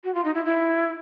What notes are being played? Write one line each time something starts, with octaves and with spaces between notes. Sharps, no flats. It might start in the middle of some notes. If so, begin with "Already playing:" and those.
F#4
F4
D#4
E4
E4